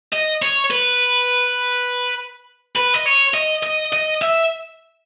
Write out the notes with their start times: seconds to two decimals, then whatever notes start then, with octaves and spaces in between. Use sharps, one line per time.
0.13 D#5
0.42 C#5
0.71 B4
2.76 B4
2.94 D#5
3.06 C#5
3.34 D#5
3.63 D#5
3.93 D#5
4.22 E5